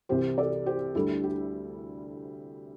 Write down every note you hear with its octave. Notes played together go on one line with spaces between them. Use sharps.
C2 C3 E3 G4 C5
A4 D5
G4 C5
D2 D3 G3 E4 A4
G4